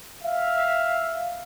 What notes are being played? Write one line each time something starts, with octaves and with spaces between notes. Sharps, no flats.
E5 F5